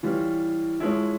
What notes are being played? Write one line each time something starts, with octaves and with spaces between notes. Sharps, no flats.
E3 G3 C#4 F4
F3 G#3 C#4 E4